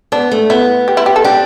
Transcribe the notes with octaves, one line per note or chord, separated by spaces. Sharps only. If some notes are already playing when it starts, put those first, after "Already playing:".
B3 D4
A3
B3 E4
G4
E4
G4
A4
D4 G4